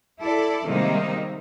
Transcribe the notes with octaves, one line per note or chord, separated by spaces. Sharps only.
E4 A4 D5
C3 D#3 G3 G#3 A#3 D#4